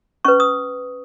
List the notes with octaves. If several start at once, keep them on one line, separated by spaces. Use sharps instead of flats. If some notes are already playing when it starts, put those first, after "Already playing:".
C#4 B4 C#6
D#6